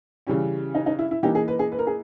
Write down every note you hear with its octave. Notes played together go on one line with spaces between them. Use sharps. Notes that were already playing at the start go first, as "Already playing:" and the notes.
C#3 E3 G3 C#4
D#4
D#4
E4
E4
E3 A#3 D#4 G4
G#4
B4
G#4
B4
A#4
G#4